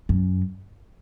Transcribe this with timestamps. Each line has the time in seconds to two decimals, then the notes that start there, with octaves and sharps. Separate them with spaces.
0.09 F#2